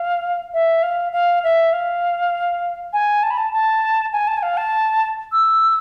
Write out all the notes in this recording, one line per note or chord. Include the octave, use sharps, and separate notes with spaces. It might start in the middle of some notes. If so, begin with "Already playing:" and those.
Already playing: F5
E5
F5
F5
E5
F5
G#5
A5
B5
A5
A5
G#5
A5
G#5
F5
A5
E6